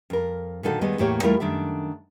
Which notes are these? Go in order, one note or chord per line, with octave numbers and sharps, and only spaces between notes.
F2 A#4
A#2 D3 D#3 D#4 F#4 A4
D#2 D#3 G3 G#3 B3 D#5
E2 A2 A#3 G4 C#5
E2 G3 A3 E4 F4 A#4
F#2 D#3 D4 A4 E5